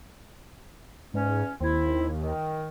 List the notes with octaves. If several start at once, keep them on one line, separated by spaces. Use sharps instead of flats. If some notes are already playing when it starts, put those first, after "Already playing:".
E2 G#2 C#4
D#2 C4 E4
D#3